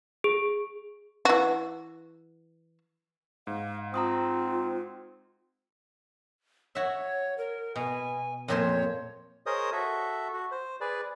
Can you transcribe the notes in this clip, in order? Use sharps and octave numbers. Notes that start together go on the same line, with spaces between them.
G#4
E3 F#4
G#2 F5
C4 F4 A#5 C6 D#6
F#4 C#5 E5
A#4
B2 G#5
F2 A#2 C5 C#5
G#4 A#4 C5 C#5 D#5 D#6
F#4 A4 E5
F#4
C5
G#4 B4 D5